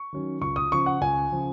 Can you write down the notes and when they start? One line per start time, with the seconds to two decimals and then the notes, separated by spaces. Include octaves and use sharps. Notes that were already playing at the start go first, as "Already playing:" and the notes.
Already playing: C#6
0.13 D#3 F#3 C#4
0.41 C#2 C#6
0.56 D#6
0.71 C#3 F3 C#6
0.86 F#5
1.01 C#2 G#5
1.32 C#3 F3